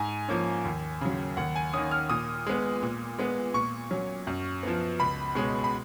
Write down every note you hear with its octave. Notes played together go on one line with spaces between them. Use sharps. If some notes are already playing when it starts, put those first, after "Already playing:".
Already playing: G#2 G#5
F3 A#3 C#4
D#2
C#3 F#3
D#2 F#5
G#5
D#3 A#3 C#4 D#6
F6
A#2 D#6
G#3 B3
A#2
G#3 B3
A#2 C#6
F#3 C#4
F#2
F3 B3
C#2 B5
B2 G#3 C#4
B5